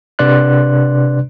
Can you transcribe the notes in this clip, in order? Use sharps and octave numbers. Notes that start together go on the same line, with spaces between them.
C3 D4 B4 D5 C6 F#6